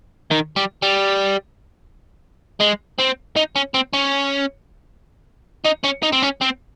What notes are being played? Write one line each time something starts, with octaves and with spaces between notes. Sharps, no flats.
D#3
G3
G3
G#3
C4
D#4
C#4
C4
C#4
D#4
C#4
D#4
C4
C#4
C4